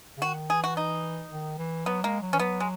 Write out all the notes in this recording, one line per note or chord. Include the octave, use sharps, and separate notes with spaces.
C#3
D#3 F#4
E3 G#4
F#4
D#4
D#3
E3
F#3 B3
G#3 A#3
F#3
E3 C#4
F#3 B3
G#3